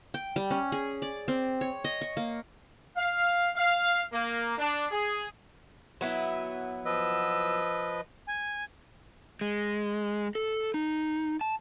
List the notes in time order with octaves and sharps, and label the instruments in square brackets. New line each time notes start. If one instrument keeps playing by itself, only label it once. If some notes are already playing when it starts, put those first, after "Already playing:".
[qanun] G5
G3
C#4
G#4
D5
C4
C#5
D#5
C#6
A#3
[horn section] F5
F5
A#3
D4
G#4
[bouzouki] F#3 B3 E4
[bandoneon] F3 B4 D#5 [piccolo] E6
[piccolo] G#5
[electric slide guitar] G#3
A4
D#4
A5